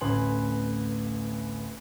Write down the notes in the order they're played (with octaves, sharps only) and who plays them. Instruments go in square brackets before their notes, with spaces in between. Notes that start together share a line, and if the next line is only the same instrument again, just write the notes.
[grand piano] D1 A1 B4 G#5 C6 F#7